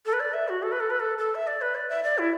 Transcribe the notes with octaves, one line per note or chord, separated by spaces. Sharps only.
A4
B4
D5
E5
F#4
A4
B4
A4
B4
A4
A4
E5
D5
B4
D5
E5
D5
E4